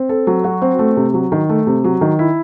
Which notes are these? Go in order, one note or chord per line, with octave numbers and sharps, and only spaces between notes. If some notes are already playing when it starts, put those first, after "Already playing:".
Already playing: C4
A4
F#3
F#4
C4
A3
C3
F#3
D#3
A3
C3
F#3
D#3
E4